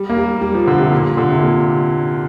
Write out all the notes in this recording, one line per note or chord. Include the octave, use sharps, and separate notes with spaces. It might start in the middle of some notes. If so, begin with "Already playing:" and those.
Already playing: G3
A#3
G3
G3
F3
D3
C3
A#2
D3
C3
A#2